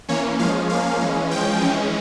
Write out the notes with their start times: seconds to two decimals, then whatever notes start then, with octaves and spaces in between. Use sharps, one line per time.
0.08 E3 A#3 C#4 C#5
0.39 F3 G#3 C#4 F5
0.70 F3 A#3 C#4 F5
1.01 E3 G#3 C#4
1.31 F3 G#3 C#4 G5
1.61 E3 G#3 C#4